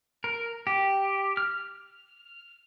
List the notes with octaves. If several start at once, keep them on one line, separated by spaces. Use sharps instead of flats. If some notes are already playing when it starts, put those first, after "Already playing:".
A#4
G4
F6